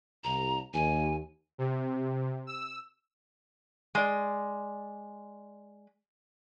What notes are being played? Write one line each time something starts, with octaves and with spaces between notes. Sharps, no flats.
C2 A#5
D#2 G#5
C3
E6
G#3 D5